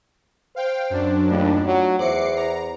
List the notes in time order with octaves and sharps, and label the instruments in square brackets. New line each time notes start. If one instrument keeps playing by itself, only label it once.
[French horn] C5 [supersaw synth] F5 G5
[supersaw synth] F#2 D4
[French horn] D#2 [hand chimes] A3 D#4 F4
[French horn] F#3
[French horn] E2 [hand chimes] C5 E5 [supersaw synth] D6 C7 C#7
[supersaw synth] A#5